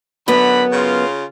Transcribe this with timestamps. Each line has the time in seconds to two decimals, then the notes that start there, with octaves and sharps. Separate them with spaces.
0.28 F#2 D3 B3 B5
0.72 C#3 F4